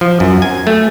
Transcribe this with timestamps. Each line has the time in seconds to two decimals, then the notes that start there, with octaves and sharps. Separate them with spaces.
0.01 F3
0.20 F#2
0.42 G#5
0.67 A3